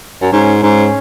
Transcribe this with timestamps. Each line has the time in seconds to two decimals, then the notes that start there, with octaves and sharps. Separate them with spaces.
0.21 F#2
0.32 G#2 C#4
0.62 G#2 C#4